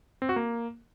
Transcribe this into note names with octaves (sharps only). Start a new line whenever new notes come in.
C4
F#4
A#3